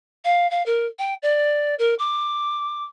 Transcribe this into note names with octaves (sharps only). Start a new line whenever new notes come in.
F5
F5
A#4
G5
D5
A#4
D6